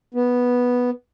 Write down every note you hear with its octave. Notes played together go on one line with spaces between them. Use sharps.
B3